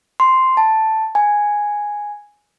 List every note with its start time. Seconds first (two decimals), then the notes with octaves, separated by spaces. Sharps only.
0.20 C6
0.57 A5
1.15 G#5